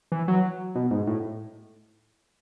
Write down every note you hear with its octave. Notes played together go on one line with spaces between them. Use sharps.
E3
F#3
B2
G#2
A2